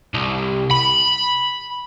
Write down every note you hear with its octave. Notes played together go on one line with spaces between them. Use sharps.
C2
B5